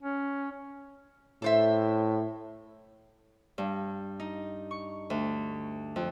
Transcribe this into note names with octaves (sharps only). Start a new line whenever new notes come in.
C#4
A2 A4 C5 E5
G2
D#4
C#6
D2
F2